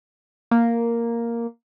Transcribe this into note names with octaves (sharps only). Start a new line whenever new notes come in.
A#3